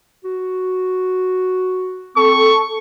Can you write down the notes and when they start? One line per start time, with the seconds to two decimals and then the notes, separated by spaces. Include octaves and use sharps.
0.25 F#4
2.16 C4 A4 C#6